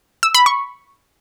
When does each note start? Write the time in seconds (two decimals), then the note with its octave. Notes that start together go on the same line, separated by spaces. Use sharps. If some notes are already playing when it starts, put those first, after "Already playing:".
0.23 E6
0.35 B5
0.46 C#6